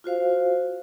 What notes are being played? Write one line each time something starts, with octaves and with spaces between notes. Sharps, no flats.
F4 F#4 C5 F5